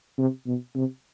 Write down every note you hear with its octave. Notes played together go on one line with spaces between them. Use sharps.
C3
B2
C3